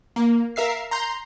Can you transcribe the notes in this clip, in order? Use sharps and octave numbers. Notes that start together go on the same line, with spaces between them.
A#3
A#4 E5 F5 C7
A#5 C6 G6